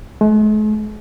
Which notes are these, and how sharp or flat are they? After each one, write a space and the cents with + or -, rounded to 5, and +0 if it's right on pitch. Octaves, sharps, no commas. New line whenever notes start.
G#3 +45